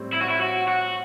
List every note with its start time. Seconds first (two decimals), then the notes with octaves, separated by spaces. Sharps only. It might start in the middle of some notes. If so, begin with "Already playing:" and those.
Already playing: A2 G3 C4
0.13 E4
0.22 F#4
0.29 E4
0.41 F#4
0.68 F#4